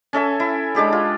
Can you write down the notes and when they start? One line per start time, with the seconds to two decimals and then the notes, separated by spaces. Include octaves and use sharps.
0.13 C#4 A4 E5 G#5
0.40 E4
0.75 G#3 D4 G4 G#4
0.93 F4